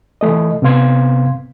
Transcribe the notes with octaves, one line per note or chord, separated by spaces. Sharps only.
E3 A3 D#5
C3 B3 C4 F5 C6 G#6